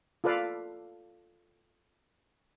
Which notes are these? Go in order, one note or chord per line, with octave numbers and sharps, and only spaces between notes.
F4 A4 B4 D5 F5